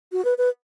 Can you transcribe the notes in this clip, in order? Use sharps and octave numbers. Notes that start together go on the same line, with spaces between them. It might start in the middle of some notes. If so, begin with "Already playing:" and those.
F#4
B4
B4